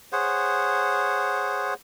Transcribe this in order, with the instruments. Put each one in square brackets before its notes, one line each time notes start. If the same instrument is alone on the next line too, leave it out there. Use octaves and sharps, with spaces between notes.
[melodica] G#4 C5 C#5 F#5